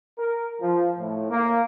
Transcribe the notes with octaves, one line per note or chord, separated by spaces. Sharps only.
A#4
F3
A2
A#3